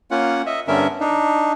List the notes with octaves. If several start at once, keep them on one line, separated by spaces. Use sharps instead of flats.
A#3 C#4 F4 F#5
D#5 E5
G2 D3 B3 C#4 A#4 E5
D4 D#4